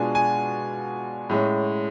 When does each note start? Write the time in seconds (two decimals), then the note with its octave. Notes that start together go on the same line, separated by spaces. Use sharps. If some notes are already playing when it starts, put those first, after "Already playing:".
Already playing: B2 G#3 D4 F4 G#5
0.15 G#5
1.30 A2 G#3 C#4